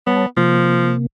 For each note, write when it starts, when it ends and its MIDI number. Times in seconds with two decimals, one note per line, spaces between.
0.07 0.26 55
0.07 0.25 59
0.07 0.26 73
0.07 0.26 81
0.37 1.06 48
0.37 0.92 53
0.37 1.06 58